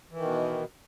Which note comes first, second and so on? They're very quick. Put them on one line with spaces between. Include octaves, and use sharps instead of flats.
E3 D#3 B2